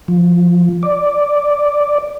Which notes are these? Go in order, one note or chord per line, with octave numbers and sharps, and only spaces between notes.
F3
D5